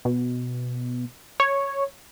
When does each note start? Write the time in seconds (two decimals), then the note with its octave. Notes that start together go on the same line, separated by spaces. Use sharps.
0.05 B2
1.40 C#5